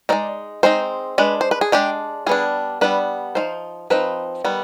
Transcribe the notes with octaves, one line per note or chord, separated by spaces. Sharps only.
G#3 C4 D#4 D5
G#3 C4 D#4 C5
G#3 D4 B4
C5
B4
G#4
G#3 D4 G4
G3 B3 D4 G#4
G3 B3 D4 B4
F3 C4 D#4 C5
F3 C4 D#4 B4
D#3 G3 B3